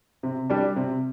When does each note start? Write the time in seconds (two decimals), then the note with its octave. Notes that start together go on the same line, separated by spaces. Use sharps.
0.23 C3
0.50 G3 D4
0.76 C3